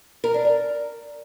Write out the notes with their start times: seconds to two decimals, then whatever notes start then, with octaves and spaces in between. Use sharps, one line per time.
0.24 A#4
0.34 D4
0.45 A#4